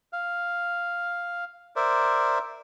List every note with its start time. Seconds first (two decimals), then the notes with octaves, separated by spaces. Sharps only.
0.13 F5
1.76 A#4 C5 D5 E5